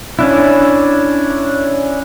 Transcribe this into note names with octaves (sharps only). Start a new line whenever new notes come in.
C#4 D4 E4